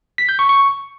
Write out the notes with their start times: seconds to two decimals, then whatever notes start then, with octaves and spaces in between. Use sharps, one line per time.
0.18 B6
0.29 G6
0.39 C#6
0.49 C#6